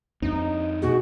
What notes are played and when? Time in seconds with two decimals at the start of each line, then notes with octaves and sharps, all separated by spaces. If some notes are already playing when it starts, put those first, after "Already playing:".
0.22 F2 C4 D4 D#4
0.82 B2 B3 F#4 G#4